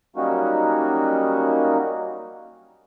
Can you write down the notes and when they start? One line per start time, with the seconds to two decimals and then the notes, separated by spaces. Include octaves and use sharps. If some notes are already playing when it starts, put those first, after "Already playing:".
0.16 F#3 G3 A#3 C#4 D#4 F#4